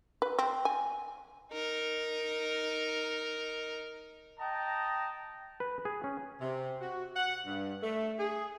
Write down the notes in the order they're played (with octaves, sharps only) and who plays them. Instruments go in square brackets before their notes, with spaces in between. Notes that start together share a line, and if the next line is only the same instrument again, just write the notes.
[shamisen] B4
C4
G#5
[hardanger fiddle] D#4 A#4
[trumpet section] D#5 G5 A5 A#5
[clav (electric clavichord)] B4
G#4
C#4
[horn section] C3
F#4
F#5
G2
A3
G#4